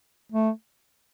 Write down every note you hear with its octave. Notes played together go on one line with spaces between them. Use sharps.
A3